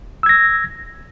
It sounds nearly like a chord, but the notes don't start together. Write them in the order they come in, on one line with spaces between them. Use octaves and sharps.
E6 G#6 A#6